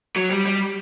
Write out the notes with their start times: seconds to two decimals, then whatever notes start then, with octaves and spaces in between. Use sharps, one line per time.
0.16 F#3
0.31 G3
0.46 G3